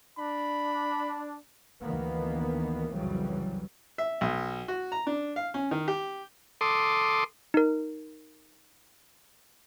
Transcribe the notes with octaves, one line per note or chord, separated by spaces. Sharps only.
D4 B5
D2 D#3 E3 A#3 B3
C2 F2 C#3 E3 F#3 G3
E5
B1
F#4
A#5
D4
F5
C#4
D#3
G4
A4 C6 D6 D#6
D#4 A#4